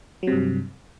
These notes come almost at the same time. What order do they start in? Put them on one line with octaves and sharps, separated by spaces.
F#3 C3 G2